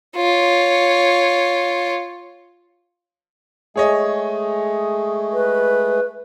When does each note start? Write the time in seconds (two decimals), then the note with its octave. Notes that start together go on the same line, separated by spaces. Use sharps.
0.16 F4 C#5
3.76 G#3 A3 G#4 C#5 D#5
5.33 B4